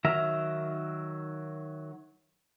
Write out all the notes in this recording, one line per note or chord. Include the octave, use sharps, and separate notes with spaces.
D#3 F#3 A#4 E5 A#5